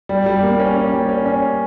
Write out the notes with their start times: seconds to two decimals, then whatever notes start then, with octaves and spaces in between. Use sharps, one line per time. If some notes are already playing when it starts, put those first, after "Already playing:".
0.09 G3
0.26 G3
0.43 A#3
0.59 C#4
0.76 C#4
0.93 G3
1.09 C#4
1.25 C#4